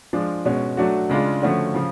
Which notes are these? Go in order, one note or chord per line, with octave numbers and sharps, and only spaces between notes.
F3 G#3 D4 F4
B2 G#3 C#4 F#4
F#3 A3 D4 F#4
C#3 G#3 D4 F4
D3 F3 A3 C#4 F#4
C#3 F3